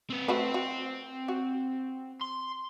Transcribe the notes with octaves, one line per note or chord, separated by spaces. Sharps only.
C4 B4
A3 C4 F#4 B4 C5
F#4
F#4
C6